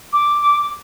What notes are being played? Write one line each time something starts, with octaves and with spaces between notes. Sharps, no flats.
D6